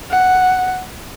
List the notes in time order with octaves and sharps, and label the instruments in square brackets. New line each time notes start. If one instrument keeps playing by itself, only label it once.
[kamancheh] F#5